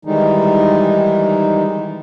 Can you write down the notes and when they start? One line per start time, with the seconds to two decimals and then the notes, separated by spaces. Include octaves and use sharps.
0.05 D#3 E3 G3 G#3 D#4